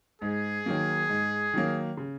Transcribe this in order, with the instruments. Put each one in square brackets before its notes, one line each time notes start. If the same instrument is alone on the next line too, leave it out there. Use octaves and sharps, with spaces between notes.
[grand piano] G#2 [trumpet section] G#4
[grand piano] D#3 F#3 A#3
G#2
D#3 F#3 A#3
C#3